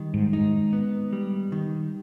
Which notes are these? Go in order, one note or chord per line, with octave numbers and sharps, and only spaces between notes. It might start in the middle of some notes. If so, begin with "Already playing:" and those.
Already playing: D#3 G3
G#2
G#2 D#4
B3
G3
D#3